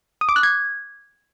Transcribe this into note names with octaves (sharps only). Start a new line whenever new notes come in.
D#6
D6
F#6
G#6